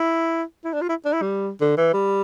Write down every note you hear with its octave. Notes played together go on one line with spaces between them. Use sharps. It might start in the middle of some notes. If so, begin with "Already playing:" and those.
Already playing: E4
E4
D4
F4
E4
D4
E4
G3
D3
E3
G3